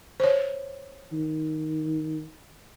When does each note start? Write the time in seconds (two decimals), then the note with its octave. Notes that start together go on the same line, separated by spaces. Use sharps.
0.20 C5 C#5
1.13 D#3